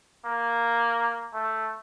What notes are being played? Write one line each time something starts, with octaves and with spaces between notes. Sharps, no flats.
A#3
A3